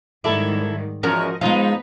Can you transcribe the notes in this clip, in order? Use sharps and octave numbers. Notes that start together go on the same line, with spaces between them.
G#2 D#3 G3 E4 A4 D5
E2 F3 C#4 F#4 A#4 D#5
F3 G#3 B3 D#4 F4 B4